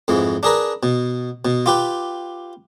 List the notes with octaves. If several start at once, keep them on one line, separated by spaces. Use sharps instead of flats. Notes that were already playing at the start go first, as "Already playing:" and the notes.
F2 G#2 E3
D4 G#4 A#4 B4
B2
B2
F4 G4 B4